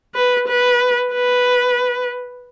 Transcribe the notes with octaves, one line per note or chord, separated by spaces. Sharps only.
B4
B4
B4